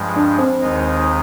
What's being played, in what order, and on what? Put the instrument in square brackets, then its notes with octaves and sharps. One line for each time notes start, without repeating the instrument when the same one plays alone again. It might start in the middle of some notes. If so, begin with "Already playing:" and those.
Already playing: [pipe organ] G2 F3 G#3
[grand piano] D4
C4
[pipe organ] D#2 D#3 G#3 D#4